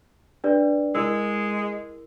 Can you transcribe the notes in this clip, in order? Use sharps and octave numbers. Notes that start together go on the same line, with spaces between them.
D4 B4 D5
G#3 E4 A#4 E6